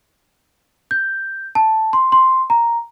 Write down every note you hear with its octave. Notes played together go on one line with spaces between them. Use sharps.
G6
A5
C6
C6
A#5